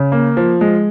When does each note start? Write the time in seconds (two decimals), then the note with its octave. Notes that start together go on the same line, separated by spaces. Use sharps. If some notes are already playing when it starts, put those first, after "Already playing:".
Already playing: C#3
0.12 A#3
0.37 F3
0.61 G#3